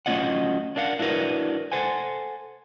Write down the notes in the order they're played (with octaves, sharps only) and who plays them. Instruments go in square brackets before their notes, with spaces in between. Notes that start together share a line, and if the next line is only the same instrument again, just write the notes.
[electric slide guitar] F#3 A3 C#4 F4 D#5 F#5
D4 A#4 F5 F#5
D4 E4 F#4 A#4 B4
A4 C5 F#5 G#5